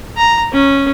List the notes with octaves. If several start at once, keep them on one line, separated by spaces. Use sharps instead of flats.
A#5
C#4